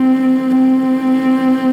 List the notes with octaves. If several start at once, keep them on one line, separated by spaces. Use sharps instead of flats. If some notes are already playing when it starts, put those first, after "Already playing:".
Already playing: C4
C4